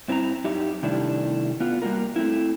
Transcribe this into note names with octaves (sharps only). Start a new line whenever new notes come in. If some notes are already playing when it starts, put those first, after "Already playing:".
G2 C4 E4 A5 A#5
F#2 D#4 G4 E5
C3 D#3 G3 A3 D4 E4
B3 F4
G3 A#3 F#4 A#4
A3 C4 E4